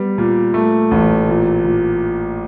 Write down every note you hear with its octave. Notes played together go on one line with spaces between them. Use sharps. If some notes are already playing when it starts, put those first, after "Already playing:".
Already playing: G3 B3
A#2
A3
A1
A#2
A#2